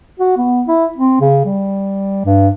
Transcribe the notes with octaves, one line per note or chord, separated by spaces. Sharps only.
F#4
B3
E4
C4
C#3
G3
G2